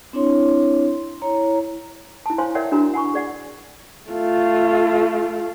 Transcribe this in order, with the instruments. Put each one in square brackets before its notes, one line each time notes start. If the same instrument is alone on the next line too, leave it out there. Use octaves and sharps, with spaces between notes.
[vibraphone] C4 D4 E4 C#5 C6
E4 C#5 A#5
[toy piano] E4 A5
C5 C#5 F5 G#5 C6
A#4 C#5 D5 E5 F#5 G5
D4 E4 F#4 A#4 A#5
F#5 G#5 B5 C#6
G#4 D5 F#5
[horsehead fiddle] A3 F4